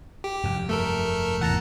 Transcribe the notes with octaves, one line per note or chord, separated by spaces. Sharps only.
G4
F1 G2
A3 A4 A#4
G#1 E2 E3 F#5 A5 A#5